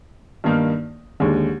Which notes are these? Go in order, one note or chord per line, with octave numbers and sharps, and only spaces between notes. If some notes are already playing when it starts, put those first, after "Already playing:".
G2 D#3 A#3 D#4
D#2 D3 G#3